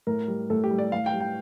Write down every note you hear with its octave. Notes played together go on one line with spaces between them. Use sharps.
A2 A#4
G3
A2 A4
G4
G3
D5
A2 F5
G5
G3
G5